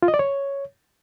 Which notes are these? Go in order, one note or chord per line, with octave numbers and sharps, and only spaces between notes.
F4
D#5
D5
C#5